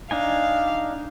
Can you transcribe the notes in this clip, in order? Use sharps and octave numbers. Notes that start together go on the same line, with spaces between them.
D4 D#4 F5 G#5